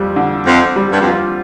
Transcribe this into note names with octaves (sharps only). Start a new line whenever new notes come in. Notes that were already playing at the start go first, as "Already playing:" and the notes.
Already playing: F2 G3
D3
F2 C4
G3
G2
F2
F4